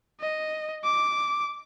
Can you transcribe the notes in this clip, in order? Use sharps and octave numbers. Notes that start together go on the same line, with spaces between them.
D#5
D6